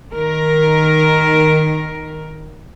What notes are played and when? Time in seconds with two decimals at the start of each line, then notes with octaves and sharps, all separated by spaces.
0.12 D#3 A#4